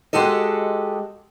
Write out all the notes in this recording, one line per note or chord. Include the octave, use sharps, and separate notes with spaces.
G#3 F#4 G4 A4 D#5